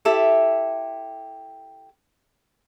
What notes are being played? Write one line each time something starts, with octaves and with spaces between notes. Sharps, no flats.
E4 G4 A4 E5